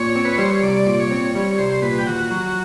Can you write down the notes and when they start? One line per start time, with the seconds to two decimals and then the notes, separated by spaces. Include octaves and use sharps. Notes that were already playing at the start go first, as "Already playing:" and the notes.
Already playing: A#2 C#5
0.16 C4
0.25 B4
0.37 G3 C5
0.50 C#5
0.62 C2 D5
0.86 A#2
0.99 C#5
1.11 C4
1.35 G3 C#5
1.51 C#5
1.58 C2 C5
1.82 A#2 B4
1.99 G4
2.07 D#2 F#4
2.31 F#3